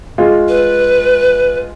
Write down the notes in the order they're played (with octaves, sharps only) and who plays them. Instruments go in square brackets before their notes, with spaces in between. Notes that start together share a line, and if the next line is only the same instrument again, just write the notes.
[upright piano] G#3 F4
[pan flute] B4